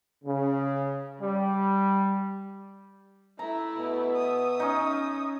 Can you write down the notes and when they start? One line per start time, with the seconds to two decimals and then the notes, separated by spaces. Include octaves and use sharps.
0.24 C#3
1.21 G3
3.39 A3 E4 A#5
3.78 B2
4.17 E5 D#6
4.60 C#4 D#4